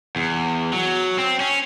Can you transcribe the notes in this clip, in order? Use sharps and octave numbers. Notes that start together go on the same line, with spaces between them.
E2
F#3
C4
C#4